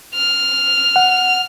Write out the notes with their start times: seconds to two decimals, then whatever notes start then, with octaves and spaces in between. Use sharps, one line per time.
0.16 F6
0.96 F#5